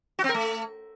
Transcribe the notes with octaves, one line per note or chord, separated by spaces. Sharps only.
F#4
C4
A#4
A3